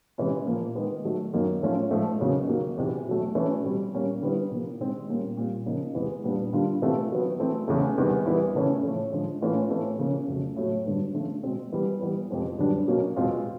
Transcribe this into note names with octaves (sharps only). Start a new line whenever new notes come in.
C3 E3 G#3 C#4 E4
A#2 F3 A#3
D#3 G#3 B3
D#3 F#3 A3
F#2 D#3 F#3 A#3
A2 F3 A3 C#4 F4
G#2 F3 A3
E2 C#3 F#3 A#3 D#4
D#3 F#3 A#3
E2 C3 E3
B2 F#3 A3
E3 A3 C#4 E4
B2 G3 C4
A#2 G3 A#3 C#4
D3 G3 B3 E4
C3 F3 A#3
C3 D#3 G#3 C4
A#2 G3 A#3 C#4
A#2 G3 C4
C#3 F3 A#3 D#4
E2 C3 E3 G#3 B3
A#2 G3 B3 D4
D3 G3 A#3 D4 F4
C3 E3 A3 C4 F4
D#3 F#3 B3
E3 A3 C4
E2 C#3 E3 A3
E2 C3 D#3 G3 B3
E3 G3 B3 E4
C#3 E3 A3 C#4
A2 F3 A3
D3 F3 G#3
A2 E3 A3 C#4 F4
A2 E3 A3 C4
C#3 F3 A#3
F2 C#3 F#3 A3
A2 F#3 A3
G2 D3 F#3 B3 D4
D3 F3 A3 C#4 F4
B2 G#3 C4
E3 G3 B3
E3 G3 B3
F2 C3 F3 G#3 B3
F#2 D3 G3 B3 D4
B2 F#3 A#3 C#4
E2 B2 G#3 C4 F4